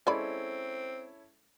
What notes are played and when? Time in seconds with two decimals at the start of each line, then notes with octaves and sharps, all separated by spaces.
0.07 G#3 C4 C#4 E4 A4 D5 B5